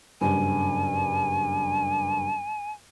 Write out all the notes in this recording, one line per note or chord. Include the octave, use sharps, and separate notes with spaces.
F#1 G2 G#5